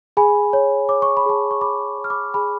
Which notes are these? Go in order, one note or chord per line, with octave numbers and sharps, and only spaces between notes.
G#4 G#5 B5
C#5
C#5 D6
C#6
B5
G#4 A5 C#6
C#6
G#4 B5 D6
C#5
F6
B5 D6
G#4 G#5 B5